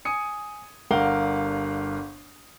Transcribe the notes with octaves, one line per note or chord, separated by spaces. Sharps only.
G#5 D#6 C#7
G1 G2 A#4 F5 F#5 G7